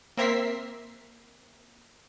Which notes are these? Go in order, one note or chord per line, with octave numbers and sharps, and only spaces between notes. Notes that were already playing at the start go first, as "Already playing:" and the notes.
A#3 C4 A#4 E5 B6 C7